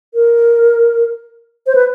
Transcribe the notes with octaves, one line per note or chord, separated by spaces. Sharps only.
A#4
C5
B4